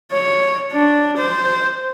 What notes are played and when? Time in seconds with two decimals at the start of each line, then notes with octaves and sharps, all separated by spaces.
0.12 C#5
0.72 D4
1.18 C5